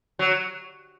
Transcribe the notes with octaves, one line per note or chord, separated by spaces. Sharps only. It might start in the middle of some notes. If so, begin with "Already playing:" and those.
F#3